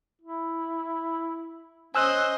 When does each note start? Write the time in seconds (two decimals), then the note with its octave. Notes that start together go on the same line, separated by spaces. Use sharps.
0.21 E4
1.95 C#4 C5 D#5 G#5 E6 F#6